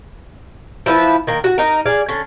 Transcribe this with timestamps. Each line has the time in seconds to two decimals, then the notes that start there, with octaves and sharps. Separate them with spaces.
0.86 F3 E4 F4 B4
1.27 D#3 A#3
1.44 F#4 F#5
1.58 D#4 A#4
1.86 G#4 D5 F5
2.08 D3 C#4